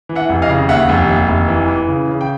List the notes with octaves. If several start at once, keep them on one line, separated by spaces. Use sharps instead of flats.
E3
E5 F#5
F1
D#5 F5
C#3
D#2 E5 F#5
F1
D#2
F1
E3
E3
C#3
C#3
G5